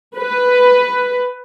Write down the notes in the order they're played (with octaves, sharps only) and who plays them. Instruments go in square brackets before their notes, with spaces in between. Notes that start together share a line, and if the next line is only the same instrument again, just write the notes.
[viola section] B4